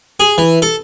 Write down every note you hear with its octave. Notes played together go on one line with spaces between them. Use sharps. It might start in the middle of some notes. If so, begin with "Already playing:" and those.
G#4
E3
A4